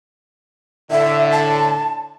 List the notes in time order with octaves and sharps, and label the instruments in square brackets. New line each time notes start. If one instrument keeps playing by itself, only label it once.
[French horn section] A2 D3 [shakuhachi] E5
[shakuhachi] A5